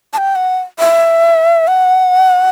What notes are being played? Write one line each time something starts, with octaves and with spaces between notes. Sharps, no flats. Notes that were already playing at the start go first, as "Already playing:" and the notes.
A5
G5
F#5
E5
F#5